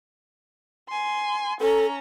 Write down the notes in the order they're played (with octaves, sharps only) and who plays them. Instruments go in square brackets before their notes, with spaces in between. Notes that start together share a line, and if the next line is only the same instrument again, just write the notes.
[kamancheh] G#5 C6
[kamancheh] C#4 A#5 [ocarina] A4